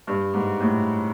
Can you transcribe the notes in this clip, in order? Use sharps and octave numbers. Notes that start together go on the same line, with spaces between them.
G2
G#2
A2